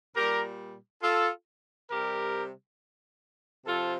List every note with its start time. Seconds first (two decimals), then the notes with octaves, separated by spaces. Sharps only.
0.15 A#2 G3 G4 A#4
1.03 F4 A4
1.91 C3 G3 G4 A#4
3.66 C3 F3 F4 A4